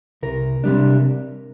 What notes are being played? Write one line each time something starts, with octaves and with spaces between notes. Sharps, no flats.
C2 A#4
C3 G3 D4